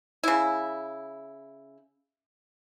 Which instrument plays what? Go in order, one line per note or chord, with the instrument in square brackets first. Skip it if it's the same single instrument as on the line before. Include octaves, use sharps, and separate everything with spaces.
[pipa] C#3 E4